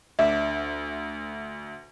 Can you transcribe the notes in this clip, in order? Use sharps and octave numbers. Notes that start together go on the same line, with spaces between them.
D2 D4 E5